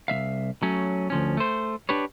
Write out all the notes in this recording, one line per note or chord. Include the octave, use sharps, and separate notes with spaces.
C2 G#3 E5 F5
F#3 A3 C#4
D2 F3 C#4
A3 C5
D4 G4 B4 C#5